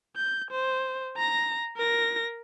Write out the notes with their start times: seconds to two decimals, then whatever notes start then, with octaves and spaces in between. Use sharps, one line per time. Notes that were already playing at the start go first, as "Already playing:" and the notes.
0.16 G6
0.51 C5
1.16 A#5 A#6
1.77 A#4 A#6